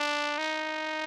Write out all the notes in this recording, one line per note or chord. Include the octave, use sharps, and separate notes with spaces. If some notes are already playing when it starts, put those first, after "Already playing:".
Already playing: D4
D#4